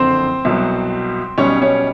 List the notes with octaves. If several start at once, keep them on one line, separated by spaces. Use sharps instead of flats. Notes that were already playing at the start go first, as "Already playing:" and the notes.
Already playing: F#1 F2 D3 C4 C5
C2 B2 F#3
B1 B2 G3 C#4 C#5
C#4 C#5